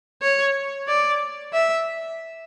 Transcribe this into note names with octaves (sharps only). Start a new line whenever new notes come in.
C#5
D5
E5